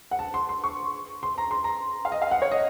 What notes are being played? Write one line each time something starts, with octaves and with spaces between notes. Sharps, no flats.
F#5
A5
C6
C6
C#6
C6
A#5
C6
A#5
F5
D#5
F5
F#5
C#5
D#5